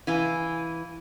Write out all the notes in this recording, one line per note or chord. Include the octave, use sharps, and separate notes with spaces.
E3 F5 G#5